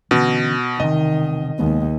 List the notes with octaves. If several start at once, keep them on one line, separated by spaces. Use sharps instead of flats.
B2 D3 E3 C#4
E1 C3 D#3 D#5
F1 D#2 G#3 B3